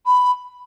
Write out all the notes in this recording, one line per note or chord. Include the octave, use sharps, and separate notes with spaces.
B5